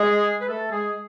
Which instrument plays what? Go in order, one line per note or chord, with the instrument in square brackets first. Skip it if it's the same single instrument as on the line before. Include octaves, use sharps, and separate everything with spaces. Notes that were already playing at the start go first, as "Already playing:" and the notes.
Already playing: [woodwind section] G#3 G#4
B4
A3 A4
G#3 G#4